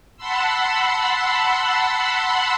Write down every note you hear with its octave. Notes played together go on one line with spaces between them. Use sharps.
F#5 A5 B5 C6 E6